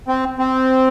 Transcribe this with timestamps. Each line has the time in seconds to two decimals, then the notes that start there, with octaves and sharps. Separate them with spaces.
0.08 C4
0.39 C4